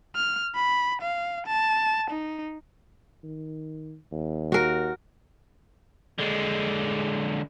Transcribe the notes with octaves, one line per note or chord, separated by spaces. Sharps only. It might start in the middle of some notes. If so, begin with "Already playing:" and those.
F6
B5
F5
A5
D#4
D#3
D#2
F#4 A#4
D3 G#3